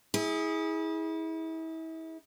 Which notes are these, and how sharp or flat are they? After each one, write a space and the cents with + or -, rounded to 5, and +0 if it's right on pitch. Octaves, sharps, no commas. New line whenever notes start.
E4 -35 G#4 +0